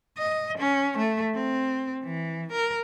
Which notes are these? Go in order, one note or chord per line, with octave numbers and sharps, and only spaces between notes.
D#5
C#4
A3
C4
E3
A#4